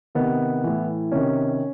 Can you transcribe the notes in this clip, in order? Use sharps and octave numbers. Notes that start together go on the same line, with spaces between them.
C3 D#3 B3
A2 E3
C3 D#3 C#4